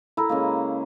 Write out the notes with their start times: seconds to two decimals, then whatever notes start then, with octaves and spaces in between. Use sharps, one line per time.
0.17 E4 A4 A#4 B5 E6
0.29 C#3 G#3 A#3